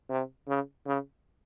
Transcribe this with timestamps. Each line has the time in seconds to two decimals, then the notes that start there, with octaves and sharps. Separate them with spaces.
0.10 C3
0.47 C#3
0.86 C#3